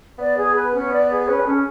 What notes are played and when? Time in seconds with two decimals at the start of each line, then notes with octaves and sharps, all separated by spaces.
0.19 B3 D5
0.37 G#4
0.56 B4
0.74 C#4
0.92 D5
1.10 G#4
1.28 C#4 B4
1.40 G#4
1.46 C#4 A4
1.52 G#4